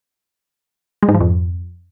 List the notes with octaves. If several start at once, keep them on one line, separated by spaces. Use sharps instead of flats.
G#3
G#2
F3
F2